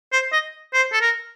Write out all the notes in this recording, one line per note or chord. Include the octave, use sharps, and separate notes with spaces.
C5
D#5
C5
A4
A#4